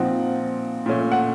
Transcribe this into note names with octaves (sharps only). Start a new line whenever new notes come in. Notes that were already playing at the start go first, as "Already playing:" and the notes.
Already playing: A#2 F3 C4 D#4 F#5
A#2 A3 C#4
F#5